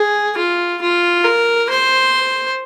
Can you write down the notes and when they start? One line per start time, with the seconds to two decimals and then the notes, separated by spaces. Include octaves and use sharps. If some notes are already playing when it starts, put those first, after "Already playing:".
Already playing: G#4
0.37 F4
0.82 F4
1.25 A#4
1.70 C5